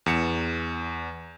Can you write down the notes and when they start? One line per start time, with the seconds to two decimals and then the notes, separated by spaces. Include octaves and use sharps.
0.06 E2 C#7 E7